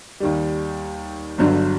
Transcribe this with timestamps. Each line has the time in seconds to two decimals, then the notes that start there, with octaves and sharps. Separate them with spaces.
0.20 D#2 D#3 G3
1.38 G1 G2 D3 F#3